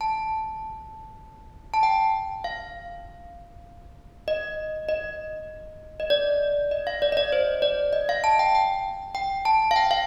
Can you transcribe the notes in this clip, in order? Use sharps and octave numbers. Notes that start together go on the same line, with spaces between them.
A5
A5
G5
F5
D#5
D#5
D#5
D5
D#5
F5
D5
D#5
D5
C5
D5
D#5
F5
A5
G5
G5
G5
A5
F5
G5
F5